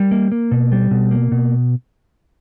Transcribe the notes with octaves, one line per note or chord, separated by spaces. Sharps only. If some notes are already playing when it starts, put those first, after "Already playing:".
Already playing: G3 A#4
A#3
A#3
B2
G3
B2
A#3
B2